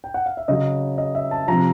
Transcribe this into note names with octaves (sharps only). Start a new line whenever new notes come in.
G5
F#5
F5
E5
C#3 F#3 D#5
D#5
E5
A5
C3 F3 A#5